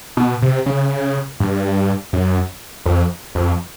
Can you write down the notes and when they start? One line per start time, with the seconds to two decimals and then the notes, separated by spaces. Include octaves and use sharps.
0.17 B2
0.42 C3
0.66 C#3
1.40 G2
2.13 F#2
2.86 F2
3.35 F2